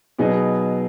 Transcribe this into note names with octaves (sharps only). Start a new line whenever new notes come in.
B2 F#3 B3 D#4 G#4